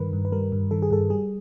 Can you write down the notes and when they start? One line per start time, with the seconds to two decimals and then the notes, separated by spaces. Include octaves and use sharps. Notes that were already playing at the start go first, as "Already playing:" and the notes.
Already playing: G2 D#3 G3 A#4 B4
0.13 G2
0.25 B4
0.32 G3 A#4
0.52 G2
0.71 D#3 A4
0.82 G#4
0.91 G2 A4
1.10 G3 G#4